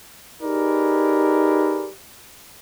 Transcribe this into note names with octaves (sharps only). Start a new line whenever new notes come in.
D#4 G4 G#4 A#4 B4 D5